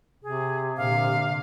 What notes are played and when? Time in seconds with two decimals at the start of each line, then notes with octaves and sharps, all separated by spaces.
0.23 C3 G#4
0.77 A#2 D3 F5